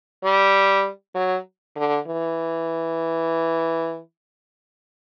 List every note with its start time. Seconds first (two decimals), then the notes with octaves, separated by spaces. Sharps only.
0.24 G3
1.15 F#3
1.76 D3
2.07 E3